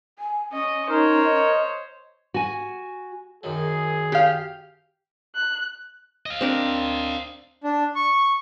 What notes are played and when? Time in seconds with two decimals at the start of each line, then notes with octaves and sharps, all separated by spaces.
0.19 G#5
0.52 C#4 D#5 C#6
0.89 D#4 A#4 C5 C#5
1.26 D#5
2.34 F#4 G#5
3.43 F#2 D#3 F#3 G#4
4.12 G4 F5
5.35 F#6
6.26 D#5 F5
6.41 C4 D4 A#4
7.64 D4
7.95 C#6